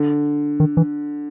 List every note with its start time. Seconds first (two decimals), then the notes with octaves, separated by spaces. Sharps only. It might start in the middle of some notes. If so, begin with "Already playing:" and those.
Already playing: D3
0.60 D#3
0.77 E3